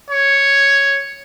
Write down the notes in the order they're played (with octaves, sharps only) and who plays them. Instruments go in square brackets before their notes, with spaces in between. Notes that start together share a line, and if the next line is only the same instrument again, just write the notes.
[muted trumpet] C#5